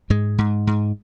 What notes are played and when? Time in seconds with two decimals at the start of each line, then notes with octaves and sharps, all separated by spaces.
0.10 G#2 G#3
0.38 G#2
0.67 G#2